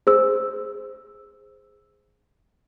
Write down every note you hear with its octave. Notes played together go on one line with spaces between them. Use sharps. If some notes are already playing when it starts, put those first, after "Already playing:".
G#4 C5 E6